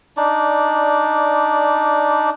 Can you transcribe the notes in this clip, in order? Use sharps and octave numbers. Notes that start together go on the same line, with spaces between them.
D4 D#4 D5